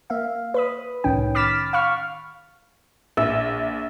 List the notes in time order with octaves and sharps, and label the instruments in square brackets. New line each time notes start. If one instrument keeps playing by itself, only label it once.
[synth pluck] A#3 E5 F5
B4 B5 D#6
C2 A2 D#3 C#4 G5
B5 D6 F6 A6 B6 E7
F5 B5 C#6 F6
[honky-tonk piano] A#1 [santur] E5